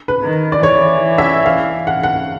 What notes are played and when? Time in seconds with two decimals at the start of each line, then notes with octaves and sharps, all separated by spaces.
0.08 B4
0.22 D#3
0.52 D5
0.63 E3 C#5
1.18 E5
1.46 F5
1.87 F#5
2.03 F#5